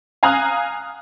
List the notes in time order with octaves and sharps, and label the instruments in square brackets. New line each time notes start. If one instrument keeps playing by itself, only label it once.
[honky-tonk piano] F5 G#5 A#5 D#6 F6 F#6